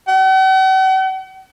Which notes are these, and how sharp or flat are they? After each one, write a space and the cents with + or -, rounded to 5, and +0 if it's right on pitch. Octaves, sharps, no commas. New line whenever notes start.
F#5 +45